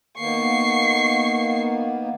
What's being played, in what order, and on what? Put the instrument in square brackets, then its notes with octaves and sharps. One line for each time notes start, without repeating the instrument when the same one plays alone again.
[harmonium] D#3 A#3 B3 [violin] C#6 C7